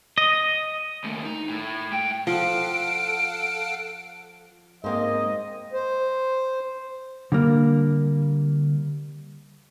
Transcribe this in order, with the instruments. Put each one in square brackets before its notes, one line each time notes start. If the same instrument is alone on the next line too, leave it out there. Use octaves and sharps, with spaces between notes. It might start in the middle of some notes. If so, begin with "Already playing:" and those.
[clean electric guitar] D#5
[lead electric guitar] D#2 A3
D#4
A2
A2 G5
[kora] F3 [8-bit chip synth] A4 F5 F#5 [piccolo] D7
[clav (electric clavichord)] G#2 C4 [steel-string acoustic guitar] A#3 C5 [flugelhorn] D#5
[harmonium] C5
[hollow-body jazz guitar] D3 G3 A#3